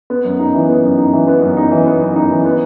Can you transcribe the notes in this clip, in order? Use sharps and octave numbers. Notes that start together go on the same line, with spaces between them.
B3
F#2
D#4
E3
B3
F#2
D#4
E3
B3
F#2
D#4
E3
B3
F#2
D#4
E3
B3